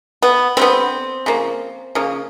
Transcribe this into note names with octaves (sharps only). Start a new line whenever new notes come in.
B3
D3 G3 B3 C4
C#3 F3 A#3
C#3 F3 A#3